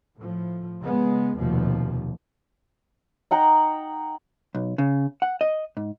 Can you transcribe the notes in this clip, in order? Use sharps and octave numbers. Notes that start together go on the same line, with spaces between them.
A2 F3
C#3 G#3 B3
F1 D#2 B2 F3
D#4 F#5 G5 A#5
B1
C#3
F#5
D#5
G#2